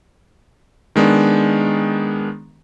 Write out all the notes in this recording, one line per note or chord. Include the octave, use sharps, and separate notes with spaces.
D#3 G#3 B3 D4